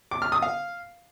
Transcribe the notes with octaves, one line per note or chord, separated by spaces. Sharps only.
D6
F6
D#6
F5